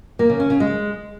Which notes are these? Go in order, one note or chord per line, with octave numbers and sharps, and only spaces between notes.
A#3
C#3
C#4
C#3
G#3